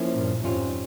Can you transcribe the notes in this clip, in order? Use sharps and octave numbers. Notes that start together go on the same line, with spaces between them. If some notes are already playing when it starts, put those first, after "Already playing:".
Already playing: F3 A#3 C#4 E4
G2 A#2
F2 G#2 G3 C#4 F4